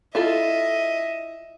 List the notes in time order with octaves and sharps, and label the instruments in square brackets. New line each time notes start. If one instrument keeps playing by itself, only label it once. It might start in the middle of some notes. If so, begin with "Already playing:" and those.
[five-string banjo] E4 F4 A4 [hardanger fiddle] D#5 E5